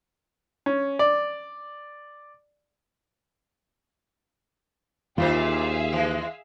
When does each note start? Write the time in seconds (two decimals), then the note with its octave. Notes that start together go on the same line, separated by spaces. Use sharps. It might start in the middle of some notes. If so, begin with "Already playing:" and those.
0.66 C#4
0.99 D5
5.18 D#2 A#2 D#3 F4 G#4 C5 E5 F5
5.93 E3 G#3